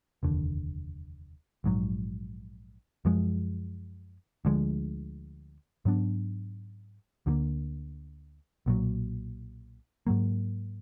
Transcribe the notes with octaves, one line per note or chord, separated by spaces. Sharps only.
F1 D#2 D3
A#1 G#2 D#3 F#3
F#2 F3 G#3
D2 D3 F3 G#3
G#2 F#3 B3 D4
D2 D3 F3 A#3
B1 A#2 F#3
G#2 F#3 A#3